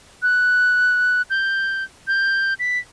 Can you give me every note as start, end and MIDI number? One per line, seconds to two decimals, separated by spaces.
0.22 1.22 90
1.30 1.84 91
2.08 2.54 91
2.59 2.78 95